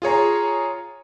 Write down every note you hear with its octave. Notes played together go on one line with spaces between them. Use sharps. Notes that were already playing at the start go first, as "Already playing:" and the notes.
F4 G#4 C#5 A#5